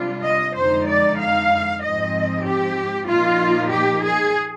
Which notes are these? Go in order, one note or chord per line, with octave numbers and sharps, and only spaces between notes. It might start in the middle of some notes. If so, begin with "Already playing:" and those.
Already playing: C3 G3 D4 F4
D#5
F2 D3 G#3 D#4 C5
D5
F5
G#2 F3 C4 D#5
G4
A#2 F3 A#3 D#4 F4
G4
G#4